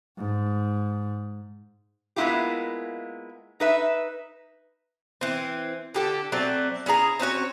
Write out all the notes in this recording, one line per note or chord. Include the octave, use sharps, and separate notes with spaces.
G#2
G#3 A#3 B3 E4 F4 G4
D#4 B4 E5
E3 C4
D3 G4 A4
F#3 A3 C4 D5
C#4 E4 G#4 A#5
C4 C#4 F#4 C#5